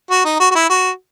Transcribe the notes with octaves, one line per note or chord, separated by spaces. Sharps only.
F#4
D#4
F#4
F#4
E4
F#4